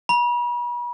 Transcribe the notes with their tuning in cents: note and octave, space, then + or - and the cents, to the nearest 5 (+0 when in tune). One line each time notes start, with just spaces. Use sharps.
B5 -40